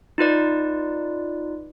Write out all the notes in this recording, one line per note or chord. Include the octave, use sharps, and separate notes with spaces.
D#4 F4 B4 D5